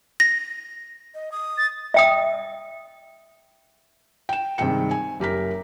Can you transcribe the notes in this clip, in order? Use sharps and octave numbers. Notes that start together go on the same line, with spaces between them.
A#6
D#5
D#6
A6
E5 G5 D#6
G5 E7
G2 C3 D#3 G#3 G5 C#7
G#5
F#1 G4 A#4 B6